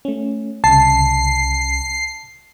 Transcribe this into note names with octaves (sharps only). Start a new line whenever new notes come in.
A3 C#4
C2 C#3 A5 C7